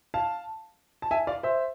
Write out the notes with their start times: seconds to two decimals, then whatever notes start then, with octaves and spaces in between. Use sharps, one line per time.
0.14 F5 A5
1.02 A5
1.11 E5 G#5
1.27 D5 F5
1.43 C5 E5